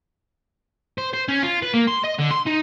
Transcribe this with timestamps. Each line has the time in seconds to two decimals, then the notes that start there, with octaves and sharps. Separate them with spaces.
0.98 C5
1.13 C5
1.28 C#4
1.43 F4
1.62 B4
1.74 A#3
1.88 C6
2.04 D#5
2.19 D3
2.31 C6
2.47 D#4